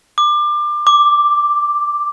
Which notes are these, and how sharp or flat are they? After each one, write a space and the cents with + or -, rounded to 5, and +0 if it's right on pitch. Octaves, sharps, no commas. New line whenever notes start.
D6 +25
D6 +0